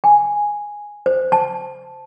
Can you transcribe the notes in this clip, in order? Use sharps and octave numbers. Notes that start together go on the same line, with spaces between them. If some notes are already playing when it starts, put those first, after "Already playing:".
G#5
C5
A5